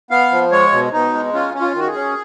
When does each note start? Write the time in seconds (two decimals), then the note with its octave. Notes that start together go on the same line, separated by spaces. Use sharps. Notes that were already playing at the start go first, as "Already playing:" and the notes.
0.11 B3 F5
0.31 F3
0.52 G#3 C#5
0.72 B2
0.92 B2 D#4
1.13 G#3
1.33 C#4 F4
1.54 C#4
1.61 F4
1.75 D#3 F#4
1.88 G#4
1.96 C#4